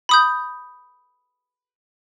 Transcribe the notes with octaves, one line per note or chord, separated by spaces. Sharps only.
B5 D#6 G6